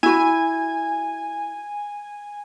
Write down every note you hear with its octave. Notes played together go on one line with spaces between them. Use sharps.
E4 F#4 G#5